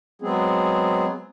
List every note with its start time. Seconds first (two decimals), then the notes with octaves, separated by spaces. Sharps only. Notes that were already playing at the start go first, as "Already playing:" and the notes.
0.22 F#3 G#3 B3 C4 G#4